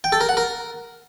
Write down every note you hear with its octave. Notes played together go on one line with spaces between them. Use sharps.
G5
A4
A#4
F#5
A#4